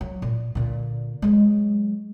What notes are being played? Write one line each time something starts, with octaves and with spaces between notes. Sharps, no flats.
F#3
A#2
A#2 D3
F#3 G#3